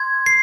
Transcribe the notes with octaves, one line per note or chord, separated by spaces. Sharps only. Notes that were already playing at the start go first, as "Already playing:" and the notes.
Already playing: C6 G#6
C7